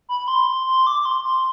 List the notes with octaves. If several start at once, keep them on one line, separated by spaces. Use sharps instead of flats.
B5
C6
C6
D6
D6
C6
C6